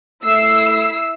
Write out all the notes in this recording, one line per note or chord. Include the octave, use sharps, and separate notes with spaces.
A3 E4 E6 C7